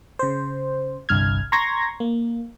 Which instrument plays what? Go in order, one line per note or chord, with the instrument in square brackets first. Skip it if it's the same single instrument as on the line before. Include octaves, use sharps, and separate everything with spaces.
[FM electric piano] C#3 C5
G1 C2 G2 F6 G#6
A#5 C6 C#6 G#6 A#6
A#3